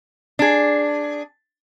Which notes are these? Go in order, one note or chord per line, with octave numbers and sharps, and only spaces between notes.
D4 G#4